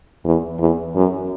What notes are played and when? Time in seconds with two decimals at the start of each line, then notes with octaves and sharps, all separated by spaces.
0.25 E2
0.60 E2
0.95 F#2